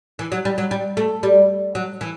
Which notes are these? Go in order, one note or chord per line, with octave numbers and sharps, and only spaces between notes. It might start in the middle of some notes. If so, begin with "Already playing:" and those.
E3
F#3
G3
F#3
G3
A3
G3
F#3
E3